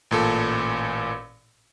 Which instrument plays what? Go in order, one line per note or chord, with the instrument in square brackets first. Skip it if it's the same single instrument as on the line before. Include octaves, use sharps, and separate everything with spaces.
[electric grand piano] A1 A#2 A4